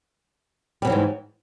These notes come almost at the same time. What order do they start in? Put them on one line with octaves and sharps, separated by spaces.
G3 B2 F#3 E3 G#2